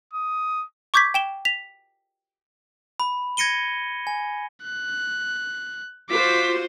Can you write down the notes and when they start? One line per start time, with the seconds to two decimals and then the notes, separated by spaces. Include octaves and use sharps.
0.13 D#6
0.94 C#6 D6 G6 G#6 B6
1.14 G5 E7 G7
1.45 B6 F7
3.00 B5
3.37 G#6 A#6 C#7 D#7 G7
4.07 G#5
4.63 F#6
6.09 F4 F#4 C5 D6 B6